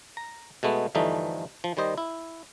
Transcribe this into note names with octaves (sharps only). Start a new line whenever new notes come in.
A#5
B2 G#3 A3 B3
G2 D3 E3 F3 A3 D#4
F3
D#3 G3 C5 D#5
E4